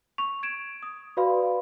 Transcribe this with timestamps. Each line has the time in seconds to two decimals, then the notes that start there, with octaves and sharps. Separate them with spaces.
0.18 C#6 F7
0.43 G#6 D7 E7
0.83 D#6
1.17 F#4 B4 D5 F5 B5 C6